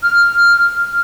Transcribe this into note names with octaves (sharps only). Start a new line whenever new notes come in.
F6